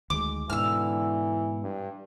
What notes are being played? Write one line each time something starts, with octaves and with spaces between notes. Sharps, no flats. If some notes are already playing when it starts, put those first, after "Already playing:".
D2 D#3 G#3 D6
G#2 B2 D3 E3 E6 F6
G2